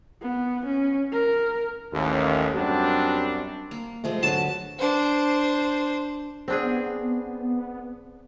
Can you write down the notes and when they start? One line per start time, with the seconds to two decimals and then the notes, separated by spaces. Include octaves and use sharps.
0.21 B3
0.66 C#4
1.12 A#4
1.93 A1 D#2
2.55 F#2 G3 C4 D4 F#4
3.71 A#3
4.04 C3 F3 G#3 A3
4.23 D3 F#3 F#4 B4 A5
4.79 D4 C5
6.48 B3 C4 D4 G#4